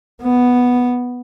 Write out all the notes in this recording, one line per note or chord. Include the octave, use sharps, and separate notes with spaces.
B3